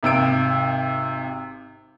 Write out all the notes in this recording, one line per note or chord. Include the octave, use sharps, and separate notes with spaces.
G#1 C3 E6 D7